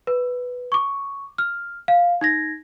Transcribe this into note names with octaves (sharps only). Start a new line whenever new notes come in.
B4
C#6 D6
F6
F5
D#4 G#6 A#6